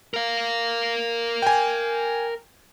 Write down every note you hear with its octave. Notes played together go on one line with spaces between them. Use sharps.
A#4 F5
G5 G#5